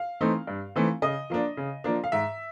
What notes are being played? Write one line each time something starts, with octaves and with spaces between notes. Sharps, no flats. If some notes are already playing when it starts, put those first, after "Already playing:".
Already playing: F5
E3 A3 C4 D#4
G2
E3 A3 C4 D#4
C#3 D#5
F3 A#3 D4
C#3
F3 A#3 D4
F5
G#2 E5